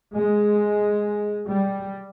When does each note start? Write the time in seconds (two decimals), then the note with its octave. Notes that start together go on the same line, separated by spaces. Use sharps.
0.15 G#3
1.48 G3